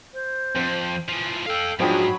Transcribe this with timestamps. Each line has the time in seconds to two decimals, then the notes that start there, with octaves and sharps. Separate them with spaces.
0.14 C5
0.55 F2 C4
1.09 E3 F3
1.46 A4 F5 G5
1.80 G#2 F3 F#3 D4 G#4 G5 B5